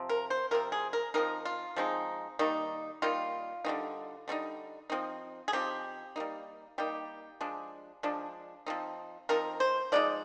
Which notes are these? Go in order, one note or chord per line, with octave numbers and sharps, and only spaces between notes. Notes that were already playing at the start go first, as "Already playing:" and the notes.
Already playing: C3 F3 C4
A#4
C5
C3 F3 C4 A#4
G#4
A#4
F3 G#3 C4 D#4 A#4
F4
F3 G#3 C4 D#4
D#3 G3 A#3 D#4
D#3 G3 A#3 D#4 F4
D3 G3 C4 D#4
D3 G3 C4 D#4
F3 C4 D#4
G#4
F3 C4 D#4 G4
G3 A#3 D#4
G3 A#3 D#4 G4
F3 G#3 D4
F3 G#3 D4
F3 C4 D#4
F3 C4 D#4 A#4
C5
F3 G#3 D#4 D5